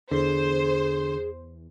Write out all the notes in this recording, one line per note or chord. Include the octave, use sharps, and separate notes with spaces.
E2 D3 G#4 C5